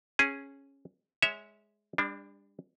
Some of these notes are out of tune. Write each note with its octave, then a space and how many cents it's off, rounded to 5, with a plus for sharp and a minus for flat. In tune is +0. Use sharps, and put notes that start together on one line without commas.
C#4 -10 G#4 +0
G#3 +0 C#5 +15 E5 -20
G3 +35 D4 +0